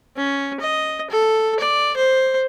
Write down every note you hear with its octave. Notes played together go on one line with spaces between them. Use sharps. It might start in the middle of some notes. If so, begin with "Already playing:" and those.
C#4
D#5
A4
D5
C5